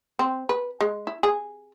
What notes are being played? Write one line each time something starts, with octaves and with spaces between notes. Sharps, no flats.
C4
B4
G#3
E4
G#4